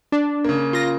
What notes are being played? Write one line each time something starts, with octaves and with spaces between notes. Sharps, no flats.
D4
C#3 A#3
F4 A#6